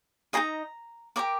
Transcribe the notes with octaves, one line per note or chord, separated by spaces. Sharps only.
D#4 G#4 D#5 A#5
G4 A#4 D5 D6